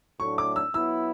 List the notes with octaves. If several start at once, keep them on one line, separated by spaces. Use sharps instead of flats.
A2 F#3 A3 D4 C#6
D6
E6
F#3 B3 E4 E6